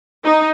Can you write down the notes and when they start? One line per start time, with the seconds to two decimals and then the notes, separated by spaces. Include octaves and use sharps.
0.24 D#4